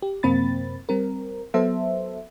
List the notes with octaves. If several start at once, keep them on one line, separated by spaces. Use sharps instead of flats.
G4
F#2 C3 A#3 C4 B5 A6
G3 C4 A#4
F#3 B3 A4 C5 E5